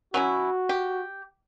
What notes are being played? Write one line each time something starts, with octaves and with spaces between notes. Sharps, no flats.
F#3 C#4 E4 F#4
G4